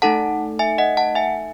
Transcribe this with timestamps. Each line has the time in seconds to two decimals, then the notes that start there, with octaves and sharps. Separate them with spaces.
0.02 A3 D#4 A4 F#5 A5
0.59 E5 G#5
0.78 D#5 F#5
0.97 F#5 A5
1.15 E5 G#5